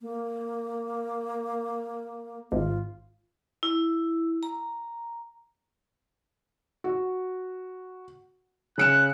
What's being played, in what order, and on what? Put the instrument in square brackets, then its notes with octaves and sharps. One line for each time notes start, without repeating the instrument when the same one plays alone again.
[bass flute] A#3
[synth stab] G#1 [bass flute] F4
[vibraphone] E4
A#5
[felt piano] F#4
[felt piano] C#3 C#7 E7 [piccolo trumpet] F#6